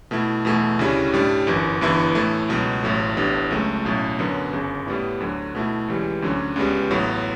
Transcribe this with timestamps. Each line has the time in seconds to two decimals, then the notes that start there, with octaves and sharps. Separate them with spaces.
0.11 B2 A3 E4
0.45 E2 B2 A3 E4
0.79 D2 C#3 G3 C#4 E4
1.13 A2 G3 D4
1.47 G1 F#2 E3
1.81 G1 G2 E3 B3 E4
2.15 A2 E3 A3 E4
2.49 C#2 B2 F#3 B3
2.82 A1 A2 F#3 A3
3.16 A1 A2 G3 B3 D4
3.51 C#2 C#3 F#3 A3
3.85 B1 A2 F#3 C#4
4.19 F#2 D3 F#3 B3
4.53 G1 F#2 C#3
4.86 A2 G3 B3 E4
5.20 D2 D3 F#3
5.55 B2 A3 E4
5.88 C#2 C#3 E3 G3
6.22 D2 D3 F#3 C#4
6.56 C#2 C#3 G3 B3
6.91 A1 A2 F#3 B3